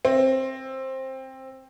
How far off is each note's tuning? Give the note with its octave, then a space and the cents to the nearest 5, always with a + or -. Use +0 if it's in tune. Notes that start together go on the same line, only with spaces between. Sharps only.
C4 +15